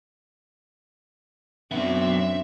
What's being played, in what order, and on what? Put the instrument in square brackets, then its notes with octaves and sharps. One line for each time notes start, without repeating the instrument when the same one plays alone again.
[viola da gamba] F#2 C4 [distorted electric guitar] F#3 B3 [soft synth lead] D4 [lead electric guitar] E5